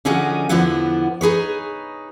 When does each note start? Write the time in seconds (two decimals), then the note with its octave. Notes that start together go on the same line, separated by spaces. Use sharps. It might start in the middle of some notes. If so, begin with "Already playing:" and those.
0.05 D3 F3 C#4 D#4 F#4 G#4
0.49 E2 D3 F3 B3 E4 F#5
1.21 D#4 G#4 B4 C#5